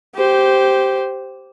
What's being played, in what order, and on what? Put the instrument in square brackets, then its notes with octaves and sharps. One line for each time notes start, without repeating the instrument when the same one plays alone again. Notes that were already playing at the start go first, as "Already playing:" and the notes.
[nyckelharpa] G4 C5